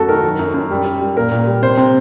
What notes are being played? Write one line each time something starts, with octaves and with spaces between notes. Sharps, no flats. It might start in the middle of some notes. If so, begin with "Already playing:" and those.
Already playing: F#2 A3 F#4 A4
D#3 A#4
F#3
F#2
F#2
G3
G3
G3
A#2 A#4
A#2
G3
C3 C5
C3